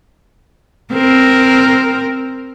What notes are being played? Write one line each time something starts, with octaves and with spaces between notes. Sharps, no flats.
C4 A#4